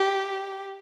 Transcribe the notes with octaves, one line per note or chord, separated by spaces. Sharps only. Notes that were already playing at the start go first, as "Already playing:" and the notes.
Already playing: G4